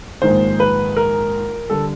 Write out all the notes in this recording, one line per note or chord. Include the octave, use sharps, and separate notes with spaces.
A#1 G#2 D#3 G#3 C5
B4
A#4
D3 G3 A4